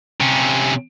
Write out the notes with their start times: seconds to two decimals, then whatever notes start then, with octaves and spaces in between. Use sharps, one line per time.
0.21 C3 C#4